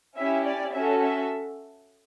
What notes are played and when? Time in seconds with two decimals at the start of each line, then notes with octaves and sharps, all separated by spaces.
0.16 C#4 E4 G4 E5
0.45 D5
0.73 C#4 F#4 A4 E5
1.01 E5